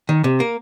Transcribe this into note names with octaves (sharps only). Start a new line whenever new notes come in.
D#3
C3
A#3